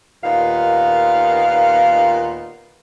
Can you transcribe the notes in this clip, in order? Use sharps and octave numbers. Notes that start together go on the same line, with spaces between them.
D#2 A#2 B3 D#4 F4 F5